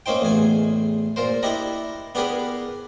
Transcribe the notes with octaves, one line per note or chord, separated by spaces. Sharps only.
A#3 C#4 D#4 C5 G5
A1 E2 G#4 G#5
A#2 A#4 C5
D4 E4 G4 D#5 A#5
B3 D4 G4 G#4 A#4 B4